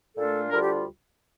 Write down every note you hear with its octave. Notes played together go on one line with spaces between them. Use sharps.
A#2 A3 D4 F4 A4
D2 D3 G3 D4 F4 A#4
G4